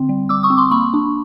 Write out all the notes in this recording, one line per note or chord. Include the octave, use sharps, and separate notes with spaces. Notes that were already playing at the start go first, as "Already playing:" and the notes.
Already playing: D3 C4
G3
G3 D6 E6
C#6 D#6
C4
C6 D6
A#3 B5 C#6
D4